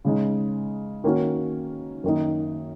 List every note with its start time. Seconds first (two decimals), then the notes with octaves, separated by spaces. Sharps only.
0.05 C#3 G#3 D#4
1.04 D#3 A#3 C#4 F#4
2.04 F#2 D#3 A#3 D#4